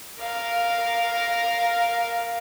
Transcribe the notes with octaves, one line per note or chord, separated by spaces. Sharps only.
A#4 F5